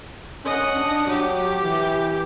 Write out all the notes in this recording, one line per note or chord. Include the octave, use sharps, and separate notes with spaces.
C#4 D#5 F#5
D4
F#3 G4 D6
E3